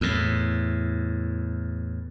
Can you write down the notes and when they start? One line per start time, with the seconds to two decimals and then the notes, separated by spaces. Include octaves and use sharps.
0.01 E2 A2